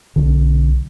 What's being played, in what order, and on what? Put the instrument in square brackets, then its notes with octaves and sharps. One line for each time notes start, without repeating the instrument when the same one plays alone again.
[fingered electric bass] B1 D3